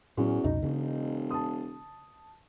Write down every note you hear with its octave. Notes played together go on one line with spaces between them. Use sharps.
E2 A2 F#3 C#4 F#4
C2 F2 B2 D#4
E1 C#3
A5 D#6